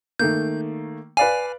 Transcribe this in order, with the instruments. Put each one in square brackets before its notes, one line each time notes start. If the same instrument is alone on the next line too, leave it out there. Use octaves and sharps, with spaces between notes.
[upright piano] D#3 A3 A#3 [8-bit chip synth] G6
[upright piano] B4 D5 F5 [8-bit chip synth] G#5